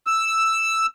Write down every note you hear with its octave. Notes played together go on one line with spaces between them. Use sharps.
E6